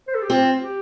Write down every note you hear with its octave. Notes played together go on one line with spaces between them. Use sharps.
C5
A4
G4
C4 F4
G4